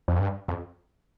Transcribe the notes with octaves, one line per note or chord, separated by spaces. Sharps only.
F2
G2
F2